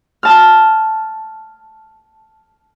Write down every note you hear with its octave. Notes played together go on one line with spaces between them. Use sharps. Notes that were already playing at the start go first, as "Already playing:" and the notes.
A5 F6